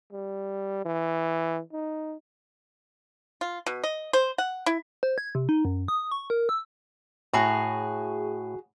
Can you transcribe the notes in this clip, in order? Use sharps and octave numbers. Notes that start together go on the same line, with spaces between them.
G3
E3
D#4
F4
B2
D#5
C5
F#5
E4
C5
G#6
C3
D#4
F#2
D#6
C#6
A#4
E6
A2 F#4 G#4 A#5